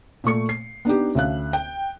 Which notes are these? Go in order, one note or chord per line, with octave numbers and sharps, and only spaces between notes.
A#2 A3 C#6 C#7
C7
B3 D4 D#4 G4
D2 C#4 E5 F5 F#6
G5